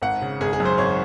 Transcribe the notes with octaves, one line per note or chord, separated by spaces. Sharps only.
G#1 F#5
C#3
G#1 G#4
G#4
F#2
C5
G#1 C#5